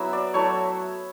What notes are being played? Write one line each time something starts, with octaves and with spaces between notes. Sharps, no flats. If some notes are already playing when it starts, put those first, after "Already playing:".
Already playing: F#3 B3 E4 E5
D5
F#3 A3 E4 C#5